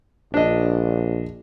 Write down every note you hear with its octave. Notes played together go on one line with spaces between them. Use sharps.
A#1 D4 D#5